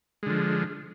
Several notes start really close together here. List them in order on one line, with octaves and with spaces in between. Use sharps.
G#3 D3 F3